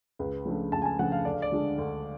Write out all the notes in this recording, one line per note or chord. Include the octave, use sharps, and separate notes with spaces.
C#2 B4
C#3 F3 A3 D4
C#2 A5
G#5
A5
C#3 F3 A3 D4 F#5
F5
D2 D5
F5
D5
D3 G#3 D4
D2